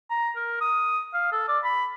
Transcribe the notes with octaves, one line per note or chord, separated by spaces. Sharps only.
A#5
A#4
D#6
F5
A4
D5
B5